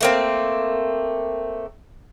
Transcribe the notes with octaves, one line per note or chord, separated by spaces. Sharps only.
A3 A#3 C4